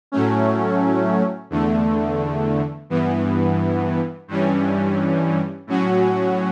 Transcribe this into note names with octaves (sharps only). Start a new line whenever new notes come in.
A2 F#3 A3 C#4
E2 D3 A3
G2 E3 B3
G2 E3 G3 C#4
A2 F#3 C#4 F#4